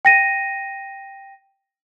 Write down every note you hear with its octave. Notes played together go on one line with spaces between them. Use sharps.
G5 A#6 D#7